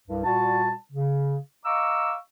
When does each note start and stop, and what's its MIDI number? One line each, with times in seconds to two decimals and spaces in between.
0.08 0.21 36
0.08 0.21 43
0.24 0.73 46
0.24 0.73 55
0.24 0.73 66
0.24 0.73 81
0.92 1.37 49
1.66 2.14 75
1.66 2.14 77
1.66 2.14 82
1.66 2.14 85
1.66 2.14 86
1.66 2.14 88